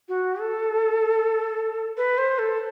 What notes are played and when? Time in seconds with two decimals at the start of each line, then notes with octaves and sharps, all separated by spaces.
0.09 F#4
0.40 A4
1.97 B4
2.18 C5
2.39 A4